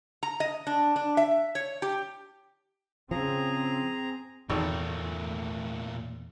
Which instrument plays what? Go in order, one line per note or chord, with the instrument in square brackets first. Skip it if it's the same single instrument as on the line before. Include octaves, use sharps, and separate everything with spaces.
[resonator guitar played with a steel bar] A#5
D#5
D4
D4
E5
C#5
G4
[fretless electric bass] C#3 F3 [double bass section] C4 [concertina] G#4 A#5
[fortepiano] G#1 [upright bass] E2 [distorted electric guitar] A#2 A3